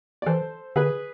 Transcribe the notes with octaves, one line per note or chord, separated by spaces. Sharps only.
D5
E3 A4 C5
D3 G#4 B4